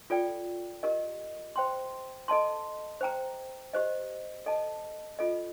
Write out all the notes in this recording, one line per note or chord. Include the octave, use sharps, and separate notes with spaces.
F4 A4 D5 G5
G4 A#4 D#5
C5 G5 C6
A4 D#5 A5 C6
C5 G5 A#5
G4 C5 D#5
A4 D#5 A5
F4 A4 D#5